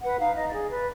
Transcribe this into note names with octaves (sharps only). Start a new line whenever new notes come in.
B4 F#5
D#4 F5
D#4 D#5
D5
G#4
B4 D5